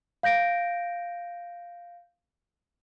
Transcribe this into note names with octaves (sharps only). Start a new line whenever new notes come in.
F5 G6 A#6 D7